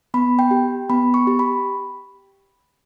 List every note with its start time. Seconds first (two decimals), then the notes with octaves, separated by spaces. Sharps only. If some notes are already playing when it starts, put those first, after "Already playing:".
0.14 B3 B5
0.39 G5
0.51 G4
0.90 B3 B5
1.14 C#6
1.27 G4
1.39 B5